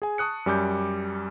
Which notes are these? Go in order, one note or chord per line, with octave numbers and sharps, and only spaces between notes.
G#4 G#5
A5 C#6 D#6 F#6 C#7
F#2 G3 G#5 D6 G6